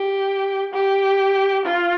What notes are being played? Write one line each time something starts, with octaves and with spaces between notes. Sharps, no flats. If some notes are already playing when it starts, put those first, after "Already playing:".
Already playing: G4
G4
F4